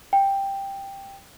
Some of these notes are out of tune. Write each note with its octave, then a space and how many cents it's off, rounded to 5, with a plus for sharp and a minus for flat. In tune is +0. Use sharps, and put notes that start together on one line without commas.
G5 +5